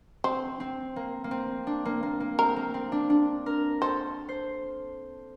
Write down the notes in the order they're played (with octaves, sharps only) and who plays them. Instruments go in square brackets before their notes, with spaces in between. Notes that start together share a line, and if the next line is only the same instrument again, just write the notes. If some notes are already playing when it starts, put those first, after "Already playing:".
[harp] C4 [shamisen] C5
[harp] C4
A#3
A#3
C4
D4
A#3
A#3
A#3
[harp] C4 [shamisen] A#4
[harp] A#3
C4
D4
D4
A#4
[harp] A4 [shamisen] C5
[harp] C5